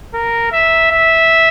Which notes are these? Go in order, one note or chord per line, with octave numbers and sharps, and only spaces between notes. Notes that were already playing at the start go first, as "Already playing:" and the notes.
A#4
E5
E5